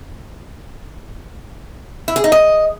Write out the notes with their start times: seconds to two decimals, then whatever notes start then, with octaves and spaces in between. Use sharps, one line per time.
2.08 E4
2.16 G#4
2.24 D#4
2.32 D#5